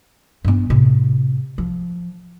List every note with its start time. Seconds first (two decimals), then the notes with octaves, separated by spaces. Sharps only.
0.44 G2 B3
0.70 A2 C3
1.58 F3